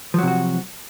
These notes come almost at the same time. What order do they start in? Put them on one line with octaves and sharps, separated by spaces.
F3 F#3 C3 F#4